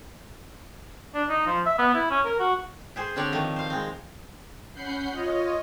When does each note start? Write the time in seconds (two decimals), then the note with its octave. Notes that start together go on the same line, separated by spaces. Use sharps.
1.15 D4
1.29 D#4
1.46 F3
1.66 E5
1.78 B3
1.94 E4
2.11 C#4
2.25 A#4
2.39 F#4
2.96 G4 G#4 C5
3.16 D3 C4 D4 C#5 D5
3.32 D#3 F3 G3 A3
3.56 C5 F5
3.70 G#3 C4
4.73 C#4 F#5 B5 G6 C7
5.11 F4 C#5 D#5